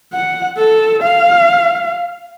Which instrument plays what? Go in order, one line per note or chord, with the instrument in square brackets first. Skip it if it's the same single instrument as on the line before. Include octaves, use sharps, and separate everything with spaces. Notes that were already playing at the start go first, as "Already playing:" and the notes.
[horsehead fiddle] F#5
A4
F5